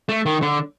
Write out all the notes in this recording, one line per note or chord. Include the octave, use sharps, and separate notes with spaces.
A3
D#3
D3